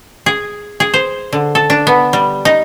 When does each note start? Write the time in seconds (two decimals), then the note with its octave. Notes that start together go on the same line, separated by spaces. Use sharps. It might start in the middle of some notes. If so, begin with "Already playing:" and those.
0.26 G#4
0.80 G#4
0.94 C5
1.33 D3
1.55 A4
1.70 D4
1.87 B3
2.13 G3
2.45 D#4